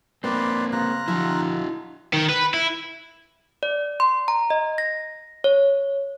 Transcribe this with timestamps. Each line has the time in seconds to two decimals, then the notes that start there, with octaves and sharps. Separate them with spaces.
0.24 A#3 C4 B4 C5 D5 C6
0.72 C#3 F4 A#5 F#6
1.08 D3 F3 E4 F#4
2.13 D#3
2.30 B4
2.54 E4
3.63 D5
4.00 C6
4.28 A#5
4.50 D#5
4.78 A#6
5.44 C#5